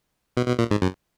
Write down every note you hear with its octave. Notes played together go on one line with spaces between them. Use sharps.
B2
B2
A#2
G#2
F#2